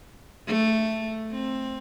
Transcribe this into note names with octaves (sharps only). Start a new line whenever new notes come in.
A3
C4